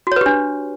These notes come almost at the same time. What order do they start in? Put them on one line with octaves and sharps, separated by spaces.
F#4 C#5 B4 G4 D4